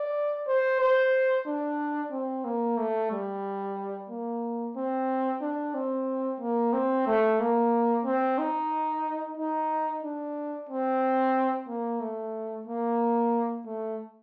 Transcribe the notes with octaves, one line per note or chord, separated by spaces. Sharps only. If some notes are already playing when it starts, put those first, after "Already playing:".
Already playing: D5
C5
C5
D4
C4
A#3
A3
G3
A#3
C4
D4
C4
A#3
C4
A3
A#3
C4
D#4
D#4
D4
C4
A#3
A3
A#3
A3